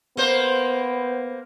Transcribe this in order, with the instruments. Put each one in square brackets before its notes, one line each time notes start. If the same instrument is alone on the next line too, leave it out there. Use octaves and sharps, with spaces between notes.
[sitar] A#3 C5 [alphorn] B3